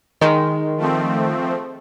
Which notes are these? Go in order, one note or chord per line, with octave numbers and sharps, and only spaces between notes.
D#3 G#3
F3 A3 C4